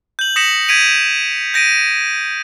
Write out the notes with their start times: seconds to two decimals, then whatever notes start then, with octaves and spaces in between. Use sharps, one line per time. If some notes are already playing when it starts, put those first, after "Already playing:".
0.19 G6 F#7
0.36 D#6 A#6 B6 C#7 E7 F#7
0.68 G#6 B6 D7 D#7 F7 F#7
1.54 G6 A#6 D7 D#7